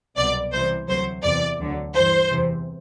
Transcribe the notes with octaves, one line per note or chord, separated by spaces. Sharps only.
C2 B2 F#3 D5
C2 C3 E3 C5
D2 C3 F#3 C5
E2 C3 E3 D5
D2 D3 F#3
G2 E3 C5
E2 C3 E3